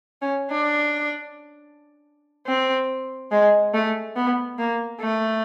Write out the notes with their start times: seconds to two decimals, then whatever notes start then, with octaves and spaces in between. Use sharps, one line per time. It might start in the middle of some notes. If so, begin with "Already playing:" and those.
0.22 C#4
0.51 D4
2.47 C4
3.32 G#3
3.74 A3
4.16 B3
4.59 A#3
5.01 A3